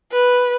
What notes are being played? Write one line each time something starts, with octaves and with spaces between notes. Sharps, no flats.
B4